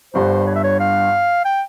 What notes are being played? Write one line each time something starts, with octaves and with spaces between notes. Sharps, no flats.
G1 G2 G3 C5
C#5
E5
C#5
F5
G5